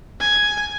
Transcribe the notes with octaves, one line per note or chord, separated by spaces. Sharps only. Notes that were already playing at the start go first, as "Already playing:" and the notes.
G#5